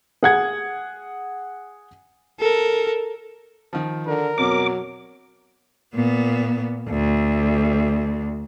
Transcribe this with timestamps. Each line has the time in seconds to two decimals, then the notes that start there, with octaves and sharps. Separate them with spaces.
0.23 G#4 F#5 G#6
2.39 A4 A#4
3.73 D#3 F3
4.06 D3 A#4
4.38 F2 B2 F#3 D6
5.94 A#2 B3
6.89 D2